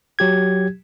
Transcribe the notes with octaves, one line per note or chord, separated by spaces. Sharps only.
F#3 G4 G#6